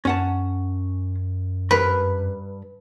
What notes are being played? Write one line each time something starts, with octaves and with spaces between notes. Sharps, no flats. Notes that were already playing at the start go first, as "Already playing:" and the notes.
F#2 C#4 F#5 A5
G2 A#4 B4 B5